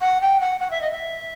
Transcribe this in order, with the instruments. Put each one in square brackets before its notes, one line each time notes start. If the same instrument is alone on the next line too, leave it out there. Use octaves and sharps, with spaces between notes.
[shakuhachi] F#5
G5
F#5
F#5
E5
D#5
E5